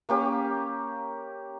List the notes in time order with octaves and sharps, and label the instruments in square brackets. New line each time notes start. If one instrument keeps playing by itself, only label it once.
[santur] A#3 C#4 G4